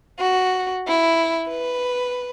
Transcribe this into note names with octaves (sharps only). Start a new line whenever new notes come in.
F#4
E4
B4